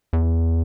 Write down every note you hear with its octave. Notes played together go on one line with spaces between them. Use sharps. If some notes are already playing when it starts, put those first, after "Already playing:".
E2